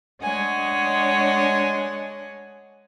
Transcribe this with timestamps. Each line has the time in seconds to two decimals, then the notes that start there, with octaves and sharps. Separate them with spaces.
0.22 G#3 D4 C#5 D#5 F#5 G#5